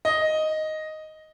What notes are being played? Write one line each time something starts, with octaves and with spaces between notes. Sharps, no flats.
D#5